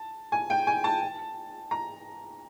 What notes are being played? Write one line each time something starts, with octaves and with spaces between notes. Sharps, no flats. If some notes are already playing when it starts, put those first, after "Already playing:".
Already playing: A5
G#5
G5
G#5
A5
A#5